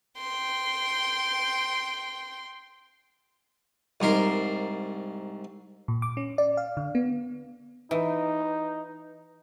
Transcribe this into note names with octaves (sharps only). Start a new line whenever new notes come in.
G5 C6
C2 G#2 A#4 C6
A#2
D6
C#4
D5
F5
D3
B3
E3 D#4